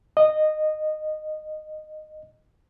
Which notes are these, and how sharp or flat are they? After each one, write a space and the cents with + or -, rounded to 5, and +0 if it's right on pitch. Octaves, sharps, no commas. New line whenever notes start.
D#5 -15